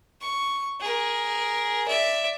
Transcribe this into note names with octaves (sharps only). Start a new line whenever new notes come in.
C#6
G#4 A#4
D5 E5